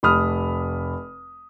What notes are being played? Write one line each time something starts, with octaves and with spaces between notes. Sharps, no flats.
F1 B5 D#6 F6